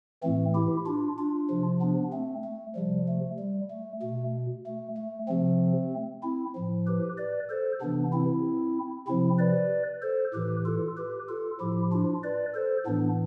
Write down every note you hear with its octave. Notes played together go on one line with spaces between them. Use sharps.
A2 E3 A3 C4
E4 G4
D4 F4
D4 F4
C3 F3
B3 D4
A3 C4
A3
C3 F3 G3
A3
G3
A3
B2 A3
A3
A3
C3 F3 A3 C4
C4 E4
A2 F3
G4 B4
B4 D5
A4 C5
C3 E3 B3 D4
C4 E4
C3 F3 C4 E4
B4 D5
A4 C5
A2 E3 G4 B4
F4 A4
G4 B4
F4 A4
A2 F3 E4 G4
D4 F4
B4 D5
A4 C5
A2 E3 B3 D4